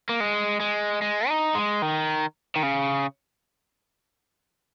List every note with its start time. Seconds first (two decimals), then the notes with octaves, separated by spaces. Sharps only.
0.09 A#3
0.20 G#3
0.60 G#3
1.02 G#3
1.28 D#4
1.55 G#3
1.82 D#3
2.56 D#3
2.63 C#3